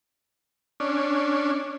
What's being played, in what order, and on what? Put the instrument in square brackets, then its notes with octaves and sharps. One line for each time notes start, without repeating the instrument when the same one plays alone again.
[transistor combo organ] C#4 D4